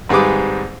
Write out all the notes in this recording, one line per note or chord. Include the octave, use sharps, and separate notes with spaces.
G#1 G#2 G3 G#4 B4 D6